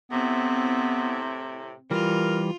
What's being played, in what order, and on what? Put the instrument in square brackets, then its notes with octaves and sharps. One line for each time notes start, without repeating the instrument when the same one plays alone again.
[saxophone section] A2 C3 E4 [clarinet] B3 [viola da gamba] C4
[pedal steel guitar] E3 G3 [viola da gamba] F4 [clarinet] A#4